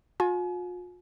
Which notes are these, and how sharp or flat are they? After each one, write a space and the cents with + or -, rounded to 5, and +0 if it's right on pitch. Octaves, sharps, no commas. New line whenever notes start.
F4 +40 G#5 +35